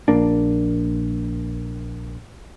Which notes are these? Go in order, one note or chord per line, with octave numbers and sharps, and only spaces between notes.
A#1 A#3 D4